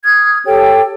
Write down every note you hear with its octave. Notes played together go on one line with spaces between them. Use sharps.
D#6 F6 G#6
G4 A4 C#5 G5